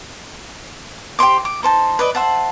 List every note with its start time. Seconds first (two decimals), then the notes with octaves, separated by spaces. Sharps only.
1.19 G4 C5 C6 D6
1.45 D6
1.63 D#4 C5 A5
1.99 B4 D5 D#5
2.15 C5 E5 F#5 A5